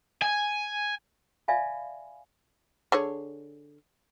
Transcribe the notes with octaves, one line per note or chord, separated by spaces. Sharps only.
G#5
D5 E5 F5 G#5 B5
D3 G#4 C#5